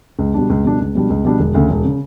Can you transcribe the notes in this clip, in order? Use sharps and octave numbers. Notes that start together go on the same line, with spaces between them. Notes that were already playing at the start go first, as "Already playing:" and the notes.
C#2
B2 G3 D4
C#2
B2 G3 D4
C#2
B2 G3 D4
C#2
B2 G3 D4
E1
D2 C#3
E1
C#3